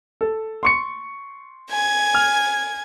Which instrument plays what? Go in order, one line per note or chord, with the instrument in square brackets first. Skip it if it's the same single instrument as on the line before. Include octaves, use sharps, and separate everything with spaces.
[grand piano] A4
C6 C#6 C#7
[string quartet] G#5 G#6
[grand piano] F6